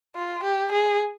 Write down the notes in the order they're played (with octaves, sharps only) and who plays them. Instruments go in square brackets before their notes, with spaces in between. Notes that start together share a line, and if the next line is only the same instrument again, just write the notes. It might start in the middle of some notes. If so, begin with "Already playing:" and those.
[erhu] F4
G4
G#4